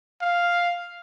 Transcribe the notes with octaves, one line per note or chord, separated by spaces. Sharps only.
F5